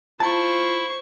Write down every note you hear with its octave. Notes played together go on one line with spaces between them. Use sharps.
E4 F4 C5 A5 C#6